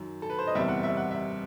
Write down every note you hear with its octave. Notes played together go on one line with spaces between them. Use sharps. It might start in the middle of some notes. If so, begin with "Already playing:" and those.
Already playing: F#2 D#3 F#3
A4
B4
C5
D#5
F#1 E2 B2 G3 C4 E5
F#5
E5
F#5
E5